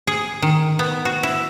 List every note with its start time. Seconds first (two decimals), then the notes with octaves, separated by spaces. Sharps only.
0.07 G#4
0.42 D#3
0.79 B3
1.05 F#4
1.23 E4